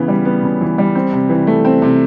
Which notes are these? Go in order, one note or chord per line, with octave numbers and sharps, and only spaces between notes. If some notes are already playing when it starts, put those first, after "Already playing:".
Already playing: C#3 E3 B3
G3
B3
C#3
E3
G3
C4
C3
E3
A3
C4
C3